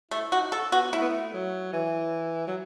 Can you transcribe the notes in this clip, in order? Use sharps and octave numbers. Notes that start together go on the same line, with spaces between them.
A3 E4
D#4 F#4
A4
B3 F#4
A3 E4
B3
A3
F#3
E3
F#3